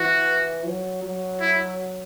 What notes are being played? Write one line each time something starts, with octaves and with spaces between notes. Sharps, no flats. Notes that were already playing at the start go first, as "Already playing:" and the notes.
Already playing: E3 F#4
F#3
F#3
E4